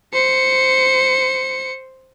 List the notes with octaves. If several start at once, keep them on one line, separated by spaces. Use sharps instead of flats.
C5 C#7